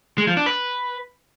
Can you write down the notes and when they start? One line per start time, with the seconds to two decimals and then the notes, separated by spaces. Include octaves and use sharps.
0.18 G#3
0.27 F3
0.37 D4
0.46 B4